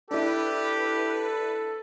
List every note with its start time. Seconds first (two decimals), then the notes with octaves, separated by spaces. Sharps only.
0.11 D4 E4 G4 A4 B4